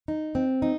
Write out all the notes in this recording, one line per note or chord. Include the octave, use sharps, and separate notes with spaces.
D#4
C4
D#4